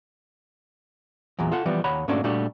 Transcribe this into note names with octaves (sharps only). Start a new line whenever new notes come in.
E2 A#2 E3 F#3
F4 A4 F#5
E3 F3 G3 B3
D#2 C#5 F#5 A#5 B5
G#2 A3 A#3 C#4 D4 F#4
A#2 G3 A3 D4 F#4 G4